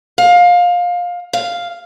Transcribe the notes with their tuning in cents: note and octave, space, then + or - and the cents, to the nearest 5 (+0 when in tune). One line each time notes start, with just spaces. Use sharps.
F5 +20
F5 +0